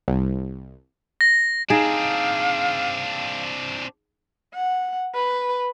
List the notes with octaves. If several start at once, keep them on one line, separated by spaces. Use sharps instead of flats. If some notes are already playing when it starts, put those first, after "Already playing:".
C2
A#6
C4 D4 D#4 G#4 F5
F#5
B4